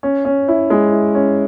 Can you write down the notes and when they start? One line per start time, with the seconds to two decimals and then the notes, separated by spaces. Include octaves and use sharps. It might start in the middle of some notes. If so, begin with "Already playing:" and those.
0.03 C#4
0.25 C#4
0.48 E4
0.70 G#3
0.92 E4
1.15 C#4